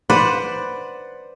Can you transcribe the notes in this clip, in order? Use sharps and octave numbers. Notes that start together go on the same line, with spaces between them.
B4 C5 D5 F#5